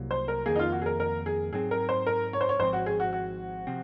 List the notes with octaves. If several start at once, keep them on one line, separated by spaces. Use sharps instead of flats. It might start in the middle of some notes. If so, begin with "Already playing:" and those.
Already playing: C2 C3 F#3 A#3
C5
A#4
F2 D#3 A#3 G#4
D#4
F4
F#4
G#4
A#4
A#4
G#4
G#2 F#3 C4 G#4
A#4
C5
A#4
C#5
C5
C#5
G#1 G#2 F3 C4 C5
F#4
G#4
F#4
F#4
C3 F3 C4